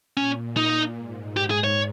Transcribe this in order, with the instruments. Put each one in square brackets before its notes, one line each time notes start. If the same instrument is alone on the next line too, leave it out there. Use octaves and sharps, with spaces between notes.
[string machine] A#2 [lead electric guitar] C#4
[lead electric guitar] D#4
[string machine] G#2
[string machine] G#2 [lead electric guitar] G4
[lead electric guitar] G#4
C#5